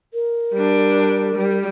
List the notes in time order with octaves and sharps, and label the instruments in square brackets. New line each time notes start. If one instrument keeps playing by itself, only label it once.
[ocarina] A#4
[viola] G3 D4
G3